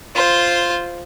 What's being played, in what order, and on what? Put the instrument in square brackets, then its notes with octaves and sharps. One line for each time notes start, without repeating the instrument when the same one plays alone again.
[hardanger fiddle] F4 C5